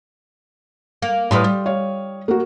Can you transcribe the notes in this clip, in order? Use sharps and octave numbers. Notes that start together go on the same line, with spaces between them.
A#3
A2 G3 B4 C6 D#6 F6
G3
C#5 F5
A#3 F#4